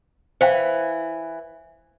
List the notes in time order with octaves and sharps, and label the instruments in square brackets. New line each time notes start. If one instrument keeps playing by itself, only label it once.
[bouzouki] E3 [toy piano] C5 F5 G5